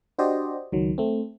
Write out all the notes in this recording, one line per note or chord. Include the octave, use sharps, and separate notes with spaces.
D4 F#4 G4 C5 D5 D#5
C#2 D#3 F#3
A3 C4